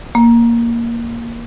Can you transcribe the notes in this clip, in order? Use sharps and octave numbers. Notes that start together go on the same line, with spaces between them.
A#3